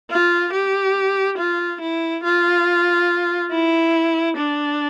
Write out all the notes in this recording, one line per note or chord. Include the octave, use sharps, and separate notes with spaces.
F4
G4
F4
E4
F4
E4
D4